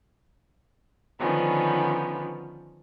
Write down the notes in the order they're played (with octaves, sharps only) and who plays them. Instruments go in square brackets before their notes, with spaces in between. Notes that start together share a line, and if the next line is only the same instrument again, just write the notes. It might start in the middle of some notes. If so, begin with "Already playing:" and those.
[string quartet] D3 D#3 F3 B3 C#4